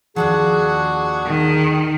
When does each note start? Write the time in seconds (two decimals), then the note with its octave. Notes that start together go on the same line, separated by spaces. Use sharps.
0.16 D#2 G#2 F3 D4 F#4 G#4 F#5
1.26 D#3